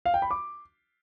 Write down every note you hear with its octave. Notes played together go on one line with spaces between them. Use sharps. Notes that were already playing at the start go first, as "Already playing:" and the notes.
F5
G5
B5
D6